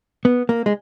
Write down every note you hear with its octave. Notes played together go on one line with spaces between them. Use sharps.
B3
A#3
G#3